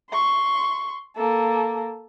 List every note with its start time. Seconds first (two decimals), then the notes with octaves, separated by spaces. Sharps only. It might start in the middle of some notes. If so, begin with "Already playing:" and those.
0.10 C6 C#6
1.16 A#3 A4